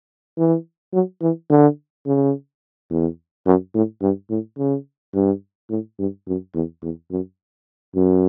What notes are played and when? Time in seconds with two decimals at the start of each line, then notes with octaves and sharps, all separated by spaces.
0.38 E3
0.93 F#3
1.22 E3
1.50 D3
2.06 C#3
2.90 E2
3.46 F#2
3.74 A2
4.02 G2
4.30 A2
4.58 C#3
5.15 G2
5.70 A2
5.99 G2
6.27 F#2
6.55 E2
6.82 E2
7.11 F#2
7.95 F#2